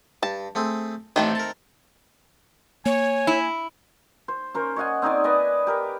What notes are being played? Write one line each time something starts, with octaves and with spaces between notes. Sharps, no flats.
G2 A5
A3 C4 G#4
A1 D#3 A3 C4 D4 G5
A#4 A5
A#3 C#5 G#5
E4
C5
C#4 A#4 C5
C#5 D#5 F#5 G#5
C4 D#4 D5 G#5
B4 D5 D#5 G#5
G4 A#4 B4